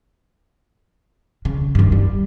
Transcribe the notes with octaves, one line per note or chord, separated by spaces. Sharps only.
C#3
G2 D#3
G3